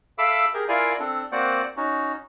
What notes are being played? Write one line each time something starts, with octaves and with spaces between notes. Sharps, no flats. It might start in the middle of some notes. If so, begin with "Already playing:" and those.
A4 E5 F5 B5 D6 E6
G4 G#4 A#4
E4 F4 A#4 D5 F5 G#5
C4 D4 A4
A#3 C4 F#4 C5 D5 F#5
C#4 D#4 F#4